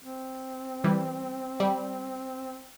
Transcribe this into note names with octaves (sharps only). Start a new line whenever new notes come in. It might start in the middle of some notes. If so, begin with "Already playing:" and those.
C4
E3 G3
G3